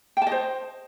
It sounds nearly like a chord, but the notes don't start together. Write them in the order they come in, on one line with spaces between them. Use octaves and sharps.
G5 A5 D#5 C5